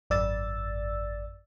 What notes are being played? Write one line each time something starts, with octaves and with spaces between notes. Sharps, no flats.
G#1 F#2 D5 E6 A6